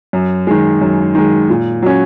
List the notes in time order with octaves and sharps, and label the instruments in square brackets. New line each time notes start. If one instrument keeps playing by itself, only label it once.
[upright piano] F#2
D#3 G#3
F#2
D#3 G#3
A#2
F#3 C#4